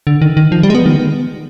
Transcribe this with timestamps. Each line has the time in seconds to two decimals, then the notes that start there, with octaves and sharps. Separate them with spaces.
0.07 D3
0.22 D#3
0.37 D#3
0.52 F3
0.63 G3
0.70 G#3
0.75 B3
0.86 D#3